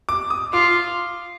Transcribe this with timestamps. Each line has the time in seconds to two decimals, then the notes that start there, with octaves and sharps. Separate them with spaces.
0.09 D6
0.30 D#6
0.53 F4 D6